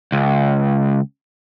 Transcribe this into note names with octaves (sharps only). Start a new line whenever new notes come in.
C#2